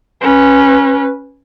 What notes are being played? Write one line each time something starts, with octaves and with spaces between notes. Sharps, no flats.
C#4 B4